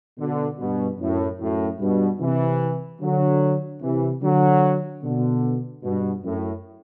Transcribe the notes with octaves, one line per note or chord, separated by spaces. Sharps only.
B2 D3
G2 B2
F#2 A2
F#2 A2
G2 B2
C3 E3
D3 F#3
C3 E3
D3 F#3
B2 D3
G2 B2
F#2 A2